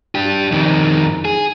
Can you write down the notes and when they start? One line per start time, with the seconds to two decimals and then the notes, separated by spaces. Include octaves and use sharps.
0.15 D4 G4
0.52 F2 D#3
1.25 G#4